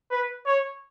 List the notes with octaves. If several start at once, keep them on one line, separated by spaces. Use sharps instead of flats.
B4
C#5